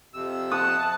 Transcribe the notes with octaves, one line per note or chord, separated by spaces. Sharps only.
F2 C3 E6
F#5 A5 D#6